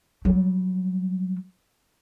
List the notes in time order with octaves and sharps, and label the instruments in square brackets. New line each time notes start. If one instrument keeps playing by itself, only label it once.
[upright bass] F#3 G3